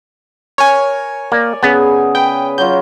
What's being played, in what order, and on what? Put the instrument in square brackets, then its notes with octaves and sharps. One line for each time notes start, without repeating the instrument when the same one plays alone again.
[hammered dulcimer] A#4 [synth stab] C#5 G#5
[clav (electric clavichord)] A#3 [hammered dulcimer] D5
[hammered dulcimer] C#3 G#4 [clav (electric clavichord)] B3
[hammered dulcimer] B4 [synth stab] G5
[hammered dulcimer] F#3 F4 [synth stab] G6